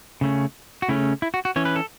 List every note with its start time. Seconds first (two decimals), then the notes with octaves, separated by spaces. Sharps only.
0.21 C#3 A3 C#4
0.82 F#4
0.89 C#3 A3 C#4 E4
1.22 E4
1.34 F#4
1.45 F#4
1.56 E3 C#4 C#5
1.65 B4
1.76 A4